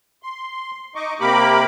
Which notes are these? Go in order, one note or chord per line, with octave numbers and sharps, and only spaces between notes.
C6
D#4 D#5 C#6 D6
C3 A#3 G4 A#4 B5 D6